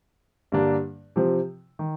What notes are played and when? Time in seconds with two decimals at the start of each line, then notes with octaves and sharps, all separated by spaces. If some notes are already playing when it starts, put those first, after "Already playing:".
0.52 G2 D3 G3 A#3 D4
1.16 C3 F3 C4
1.79 D#3